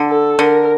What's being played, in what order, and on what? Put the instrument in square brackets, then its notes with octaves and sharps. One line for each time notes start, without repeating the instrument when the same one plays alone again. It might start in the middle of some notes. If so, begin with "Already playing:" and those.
Already playing: [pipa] D3
[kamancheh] A4
[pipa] D3 [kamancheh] A#4